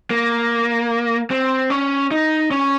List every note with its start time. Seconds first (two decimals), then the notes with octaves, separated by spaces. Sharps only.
0.11 A#3
1.31 C4
1.70 C#4
2.11 D#4
2.51 C#4